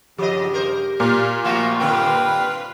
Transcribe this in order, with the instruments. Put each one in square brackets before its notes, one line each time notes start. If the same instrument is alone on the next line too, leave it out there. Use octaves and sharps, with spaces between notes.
[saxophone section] G2 C#3 [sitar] F3 D#5 [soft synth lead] G4
[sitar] A#4 C5
[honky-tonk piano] A#2 [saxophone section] F4
[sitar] F3 F#4 [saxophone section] A3 C4 F4
[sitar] G2 D3 C4 [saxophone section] F4 B4 [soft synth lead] G5